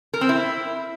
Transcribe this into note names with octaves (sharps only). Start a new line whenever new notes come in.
A#4
C4
E4